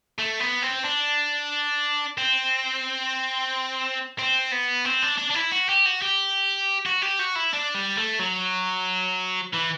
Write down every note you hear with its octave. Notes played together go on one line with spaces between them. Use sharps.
A3
B3
C4
D4
C4
C4
B3
C4
D4
D4
D4
E4
F#4
G4
F#4
G4
F#4
G4
F#4
E4
D4
G3
A3
F#3
E3